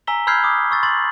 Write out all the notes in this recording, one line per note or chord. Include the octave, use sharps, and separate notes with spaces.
G#5 A#5 E6 B6 G7
B5 E6 F6 G6 G#6 C7
D6 D#6
C#6 E6 A6
C6 A6 F#7